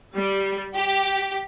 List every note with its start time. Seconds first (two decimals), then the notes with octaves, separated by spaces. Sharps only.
0.15 G3
0.76 G4